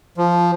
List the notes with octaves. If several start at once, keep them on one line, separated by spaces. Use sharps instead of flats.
F3